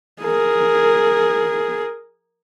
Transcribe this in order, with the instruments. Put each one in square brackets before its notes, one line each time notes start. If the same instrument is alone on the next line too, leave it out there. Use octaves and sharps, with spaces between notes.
[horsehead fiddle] G#4 A#4